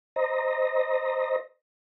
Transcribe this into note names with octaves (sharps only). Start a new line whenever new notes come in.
C5 D#5 A#5